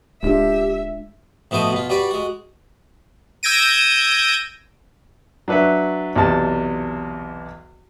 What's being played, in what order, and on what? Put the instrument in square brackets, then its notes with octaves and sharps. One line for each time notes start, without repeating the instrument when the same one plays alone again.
[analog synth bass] D1 [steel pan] G#3 D4 F4 [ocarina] G4 [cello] E5
[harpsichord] A2 F3 B3 F#4 C5 D#5
B2 F4
G3 F#4 B4 D5
G#3 F#4
[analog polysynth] E6 G6 G#6 A#6 D7 D#7
[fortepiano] F#3 D4 B4 C#5 E5
B1 E2 C3 A5